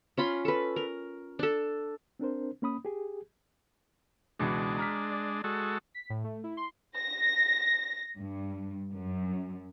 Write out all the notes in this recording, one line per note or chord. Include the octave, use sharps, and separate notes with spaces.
C#4 F4 B5 C6
A4 B4
A#4
D4 A4
C4 D4 A#4 C5
A#3 C#4 B5 D#6
G4 G#4
C#2 B2 E3 G#3 D4
A#5 F6 B6
D5
G#3 F#4 A4
B6
A2
A3
E4
C6
A#6
G2
F#2